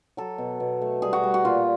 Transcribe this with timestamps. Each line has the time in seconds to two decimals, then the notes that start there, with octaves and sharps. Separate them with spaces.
0.17 F#3 A4
0.38 B2
0.60 B2
0.81 A3
1.02 G3 G#4
1.13 F#4
1.23 G3
1.34 F#4
1.45 A#2 F4